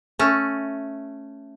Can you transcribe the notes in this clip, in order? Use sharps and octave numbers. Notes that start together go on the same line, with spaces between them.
A3 C#4